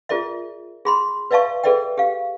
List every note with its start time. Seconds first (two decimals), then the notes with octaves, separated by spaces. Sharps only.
0.09 F4 G#4 A#4 D5 E5
0.85 G#4 B5 C6
1.31 B4 D5 E5 F5 A5 C#6
1.63 G#4 A4 B4 D5 E5 G5
1.98 G4 F5